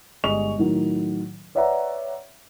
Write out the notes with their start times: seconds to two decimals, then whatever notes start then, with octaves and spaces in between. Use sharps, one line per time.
0.24 G1 G3 G#3 D#5 C#6 F7
0.58 A2 D#3 F#3
1.55 B4 C#5 D5 E5 F#5 A#5